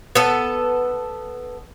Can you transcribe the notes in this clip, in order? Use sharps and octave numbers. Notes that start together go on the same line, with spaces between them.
B3 A4